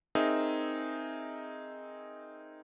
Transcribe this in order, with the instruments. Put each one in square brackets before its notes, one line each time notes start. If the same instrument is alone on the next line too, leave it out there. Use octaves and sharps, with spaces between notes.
[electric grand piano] C4 D#4 G#4 A#4 E5